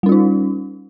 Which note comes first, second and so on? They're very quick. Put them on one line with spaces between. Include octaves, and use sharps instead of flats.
G3 C#4 F4 D#4